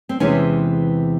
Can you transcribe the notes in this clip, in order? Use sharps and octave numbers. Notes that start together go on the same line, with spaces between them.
C4
E2 C3 E3 G#3 C#4